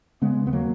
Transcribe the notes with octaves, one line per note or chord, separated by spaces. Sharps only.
C#3 G#3 B3
D#2 B3
F#3 A#3